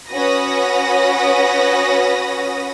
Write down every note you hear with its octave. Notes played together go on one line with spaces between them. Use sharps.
C#4 F#4 B4 D#6 A#6